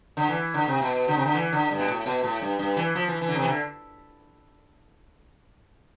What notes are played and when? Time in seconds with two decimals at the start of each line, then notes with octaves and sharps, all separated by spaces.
0.17 D3
0.29 E3
0.54 D3
0.68 C3
0.81 B2
1.08 D3
1.17 C3
1.25 D3
1.35 E3
1.53 D3
1.71 G2
1.79 B2
1.88 A2
2.06 B2
2.24 A2
2.42 G2
2.59 G2
2.77 E3
2.95 F3
3.08 E3
3.21 E3
3.28 D3
3.35 C3
3.42 E3
3.48 D3